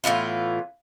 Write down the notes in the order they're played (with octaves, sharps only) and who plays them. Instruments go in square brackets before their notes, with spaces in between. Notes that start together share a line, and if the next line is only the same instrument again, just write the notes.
[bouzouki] A2 E3 B3 F4